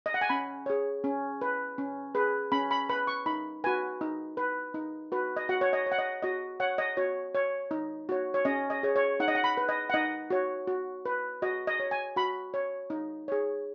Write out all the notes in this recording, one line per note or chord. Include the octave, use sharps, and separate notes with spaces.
D#5
F#5
G#5
C#4 B5
G#4 C#5
C#4
B4
C#4
G#4 B4
C#4 B5
B5
B4 B5
C#6
D#4 B5
F#4 B4 G#5
D#4
B4
D#4
F#4 B4
D#5
F#4 F#5
C#5
D#5
C#5
F#5
D#5
F#4 D#5
C#5 F#5
D#5
F#4 C#5
C#5
D#4
F#4 C#5
C#5
C#4 D#5
D#5
G#4 C#5
C#5
D#4 F#5
D#5
F#5
B5
B4
D#5
F#5
D#4 D#5
F#4 C#5
F#4
B4
F#4 D#5
D#5
C#5
G#5
F#4 B5
C#5
D#4
G#4 C#5